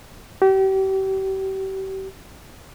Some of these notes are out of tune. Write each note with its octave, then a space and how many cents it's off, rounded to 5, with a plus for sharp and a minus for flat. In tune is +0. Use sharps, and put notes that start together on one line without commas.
G4 -35